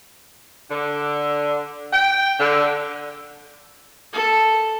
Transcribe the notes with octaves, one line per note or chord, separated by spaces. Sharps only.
D3
G5
D3
A4